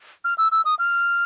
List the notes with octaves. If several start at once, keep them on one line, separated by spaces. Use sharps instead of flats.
F6
E6
E6
D#6
F6